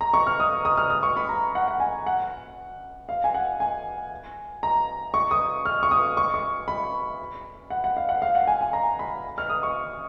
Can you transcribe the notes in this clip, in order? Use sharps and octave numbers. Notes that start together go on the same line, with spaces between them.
A#5
C#6
F6
D#6
D#6
F6
D#6
C#6
B5
A#5
F#5
F#5
G#5
F#5
F5
G#5
F#5
G#5
A#5
C#6
D#6
F6
C#6
D#6
C#6
C#6
B5
F#5
F#5
F5
F#5
F5
F#5
G#5
G#5
A#5
B5
F6
D#6
C#6